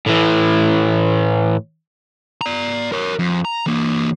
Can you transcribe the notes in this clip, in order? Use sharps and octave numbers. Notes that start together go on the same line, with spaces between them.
A2 E3
D5 A#5
A#4 C#5
F2
A#5
E3 A#3